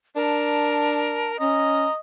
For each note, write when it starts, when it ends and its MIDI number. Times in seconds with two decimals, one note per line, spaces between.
0.16 1.37 62
0.16 1.40 70
0.16 1.31 81
1.40 1.86 61
1.40 1.99 75
1.40 1.92 82